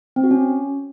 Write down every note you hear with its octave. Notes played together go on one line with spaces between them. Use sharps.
C4
F#4
C#4